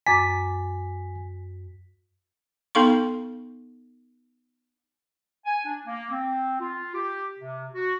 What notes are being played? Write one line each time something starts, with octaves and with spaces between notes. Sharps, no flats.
F#2 G#5 D6 A6 B6
B3 D#4 A4 F5 C6 C#6
G#5
D4
A#3
C4
F4
G4
C3
F#4